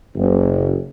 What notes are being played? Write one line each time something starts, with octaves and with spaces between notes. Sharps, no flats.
F#1